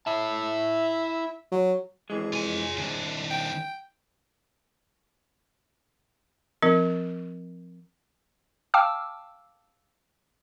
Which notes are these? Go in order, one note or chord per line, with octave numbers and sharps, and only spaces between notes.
E4 E5 A5
F#3
F2 E3 G#3 G#4
F4 G#5
C2 F#2 D#3 D4
G5
F3 C4 A#4
F5 G5 A5 D6 E6 F6